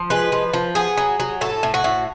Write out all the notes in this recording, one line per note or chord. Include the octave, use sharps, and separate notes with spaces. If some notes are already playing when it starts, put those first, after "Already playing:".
Already playing: F3
G#3 B4
F3
F3
B3 G#4
F#3
F#3
A2 A4
A2
F#4
A2